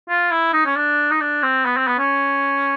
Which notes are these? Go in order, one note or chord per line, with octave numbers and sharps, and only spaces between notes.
F4
E4
D#4
C#4
D4
D#4
D4
C4
B3
C4
B3
C#4